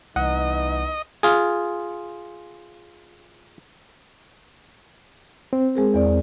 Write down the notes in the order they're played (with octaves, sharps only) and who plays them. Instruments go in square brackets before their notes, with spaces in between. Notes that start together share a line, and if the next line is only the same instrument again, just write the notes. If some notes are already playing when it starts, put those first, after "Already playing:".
[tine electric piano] C2 [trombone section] E3 B3 D#4 [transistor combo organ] D#5 [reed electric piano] F#5
[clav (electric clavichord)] F4 G#4
[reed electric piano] C4
[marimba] G#3 G#4 A#4
E2 D5